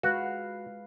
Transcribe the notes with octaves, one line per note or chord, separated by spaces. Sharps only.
G#3 F#4 B4 F5